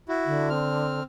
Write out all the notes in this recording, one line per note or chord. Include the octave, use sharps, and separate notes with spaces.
E4 F#4
D3
C4 F6